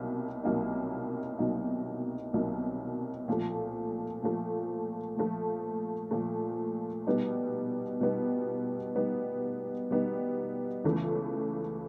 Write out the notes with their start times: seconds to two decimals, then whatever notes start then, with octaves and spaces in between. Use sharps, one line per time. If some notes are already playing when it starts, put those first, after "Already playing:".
Already playing: C2 B2 F#3 A#3 D#4
0.43 C2 B2 F#3 A#3 D#4
1.39 C2 B2 F#3 A#3 D#4
2.34 C2 B2 F#3 A#3 D#4
3.28 A#2 F3 A3
4.22 A#2 F3 A3
5.16 A#2 F3 A3
6.11 A#2 F3 A3
7.07 B2 G3 B3 D#4
8.00 B2 G3 B3 D#4
8.95 B2 G3 B3 D#4
9.91 B2 G3 B3 D#4
10.84 C#2 C#3 E3 A3